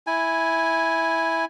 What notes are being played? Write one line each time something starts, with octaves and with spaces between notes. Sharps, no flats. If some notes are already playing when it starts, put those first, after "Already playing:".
E4 G#5